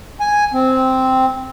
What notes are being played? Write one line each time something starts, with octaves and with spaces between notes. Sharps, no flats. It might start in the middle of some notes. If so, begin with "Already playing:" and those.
G#5
C4